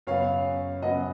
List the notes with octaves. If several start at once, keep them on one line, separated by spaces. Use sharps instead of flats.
F#2 C#3 F#3 B3 C#5 F5
F#2 C#3 F#3 B3 D#5 F#5